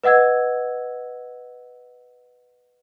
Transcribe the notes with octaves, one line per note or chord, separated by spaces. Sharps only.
B4 D#5 F#5 E6 G#6